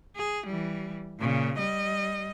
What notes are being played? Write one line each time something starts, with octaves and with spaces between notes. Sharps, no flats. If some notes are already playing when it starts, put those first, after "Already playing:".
G#4
E3 G3
A#2 C#3
G3 D#5